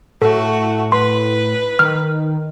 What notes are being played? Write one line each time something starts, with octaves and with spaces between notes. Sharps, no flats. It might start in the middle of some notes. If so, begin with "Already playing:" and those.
A2 A3 F#4 A4
B4 C6
D#3 F6